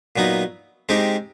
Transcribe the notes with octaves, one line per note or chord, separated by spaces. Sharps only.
A#2 F#3 B3 D#4
G#3 C4 D#4 G4